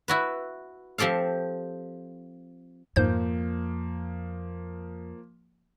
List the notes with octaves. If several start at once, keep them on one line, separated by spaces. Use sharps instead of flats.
E4 F#4 B4
F3 C4 G4 A4 F5
F2 G#2 F3 A#3 C5 G6